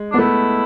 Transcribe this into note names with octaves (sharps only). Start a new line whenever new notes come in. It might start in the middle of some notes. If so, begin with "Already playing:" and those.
Already playing: G#3
B3 D4
A3 E4